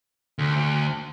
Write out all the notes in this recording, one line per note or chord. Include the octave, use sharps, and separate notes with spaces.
D2